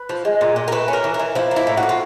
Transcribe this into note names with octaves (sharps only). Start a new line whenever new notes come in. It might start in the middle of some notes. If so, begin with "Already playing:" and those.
Already playing: B4
F3
G#3
A#2
A#2
A#4
A3 B4
C#4
A#4
E3
A#4
E3
F3 E4
A#3
E4
A2
F#4
A2
F4